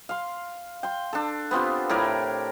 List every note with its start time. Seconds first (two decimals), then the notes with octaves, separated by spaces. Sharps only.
0.09 F5 C6
0.83 G5 C6
1.13 D4 A4
1.51 B3 C4 F4 G4
1.89 A2 E4 A#4 D5